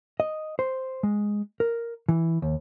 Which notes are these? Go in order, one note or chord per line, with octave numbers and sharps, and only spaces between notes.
D#5
C5
G#3
A#4
E3
D#2